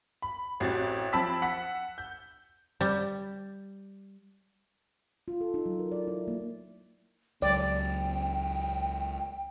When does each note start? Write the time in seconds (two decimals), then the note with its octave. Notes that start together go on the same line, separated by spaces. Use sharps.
0.22 B5
0.60 A1 C4 F#4 G4 A6
1.13 F3 C4 A5 B5 E6 B6
1.42 F#5 B6
1.98 G6
2.81 G3
5.28 F4
5.41 A4
5.54 D#4
5.66 F#3
5.79 A#4
5.92 D5
6.08 E4
6.28 A#3
7.42 C#2 F#3 D5 G5